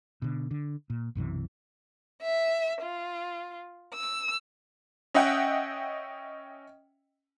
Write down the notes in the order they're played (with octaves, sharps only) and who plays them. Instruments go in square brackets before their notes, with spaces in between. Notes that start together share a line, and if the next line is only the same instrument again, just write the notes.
[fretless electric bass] B2 D3
D3
A#2
B1 F#2 C3 E3
[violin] E5
F4
E6
[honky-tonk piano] C#4 D#5 E5 F#5 G5